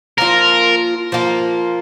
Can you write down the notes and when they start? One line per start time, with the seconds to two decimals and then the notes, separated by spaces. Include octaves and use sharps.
0.18 F3 A#3 F4 A#4
1.12 F3 A#3 F4